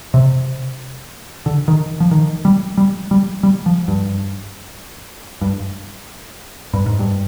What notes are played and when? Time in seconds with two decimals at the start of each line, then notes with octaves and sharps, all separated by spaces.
0.14 C3
1.46 D3
1.68 D#3
2.00 F3
2.11 D#3
2.45 G3
2.77 G3
3.11 G3
3.43 G3
3.66 F3
3.88 G2
5.41 G2
6.73 G2
6.86 G#2
6.99 G2